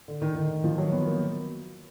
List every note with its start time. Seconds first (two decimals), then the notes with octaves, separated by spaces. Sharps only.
0.08 D3
0.22 D#3
0.36 D#3
0.64 F3
0.78 F#3
0.92 B3
1.06 A#3